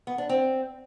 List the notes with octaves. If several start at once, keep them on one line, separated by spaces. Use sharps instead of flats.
B3
D4
C4